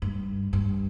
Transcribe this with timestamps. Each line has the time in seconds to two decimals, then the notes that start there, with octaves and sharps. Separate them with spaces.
0.02 G2
0.53 G2